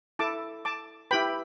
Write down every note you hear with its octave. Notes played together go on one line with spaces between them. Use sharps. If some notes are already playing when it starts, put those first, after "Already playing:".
E4 A4 A5 D6
A5 D6
E4 G4 B4 G5 B5